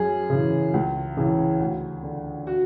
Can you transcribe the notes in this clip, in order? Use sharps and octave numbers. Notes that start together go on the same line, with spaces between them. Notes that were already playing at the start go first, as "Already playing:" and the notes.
Already playing: F#2 G#4
C#3 E3
C#2
C#3 E3
D2
D3
F#4